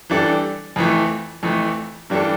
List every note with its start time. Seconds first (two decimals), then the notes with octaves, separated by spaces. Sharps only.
0.10 E3 G3 D4 A4 D5
0.76 F2 E3 A3
1.43 F2 E3 A3
2.10 G2 E3 G3 D4 A4